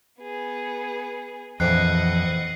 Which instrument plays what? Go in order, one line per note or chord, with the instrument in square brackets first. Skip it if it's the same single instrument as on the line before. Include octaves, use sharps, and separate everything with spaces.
[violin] B3 G#4
[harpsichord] A#1 E3 G5 [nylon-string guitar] F2 [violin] D#5 F#5 [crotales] F#6 C7